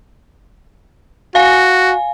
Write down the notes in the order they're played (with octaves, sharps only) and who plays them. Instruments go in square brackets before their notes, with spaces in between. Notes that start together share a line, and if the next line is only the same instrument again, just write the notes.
[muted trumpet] F#4 [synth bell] F5 G#5